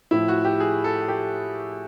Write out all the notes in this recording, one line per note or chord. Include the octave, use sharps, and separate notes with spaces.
A2 F3 E4
F#4
G4
G#4
A4
G4